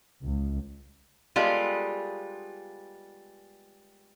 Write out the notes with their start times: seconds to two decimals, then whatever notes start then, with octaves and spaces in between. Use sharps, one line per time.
0.24 C#2
1.36 G3 G#3 B3 F4 G#4 A4